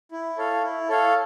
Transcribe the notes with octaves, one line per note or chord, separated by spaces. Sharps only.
E4
A4 C#5 F5
E4
A4 C#5 F5